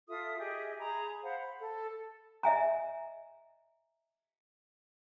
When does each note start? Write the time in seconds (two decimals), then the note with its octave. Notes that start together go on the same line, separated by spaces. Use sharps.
0.08 F4 A4 E5 D#6
0.38 G4 G#4 D#5 E5
0.79 G#4 A#5 B5
1.22 C5 F5 F#5 B5
1.39 B5
1.60 A4
2.43 D#5 E5 G#5 A#5